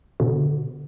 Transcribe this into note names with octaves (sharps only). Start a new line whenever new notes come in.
B2 D3